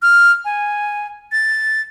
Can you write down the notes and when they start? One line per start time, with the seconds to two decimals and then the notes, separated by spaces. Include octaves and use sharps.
0.02 F6
0.45 G#5
1.32 A6